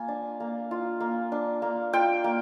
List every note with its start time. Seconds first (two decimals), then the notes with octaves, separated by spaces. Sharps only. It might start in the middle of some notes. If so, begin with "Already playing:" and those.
Already playing: A#3 F4 G#5
0.08 D4
0.40 A#3
0.71 F4
1.00 A#3
1.32 D4
1.62 A#3
1.93 F4 G5
2.24 A#3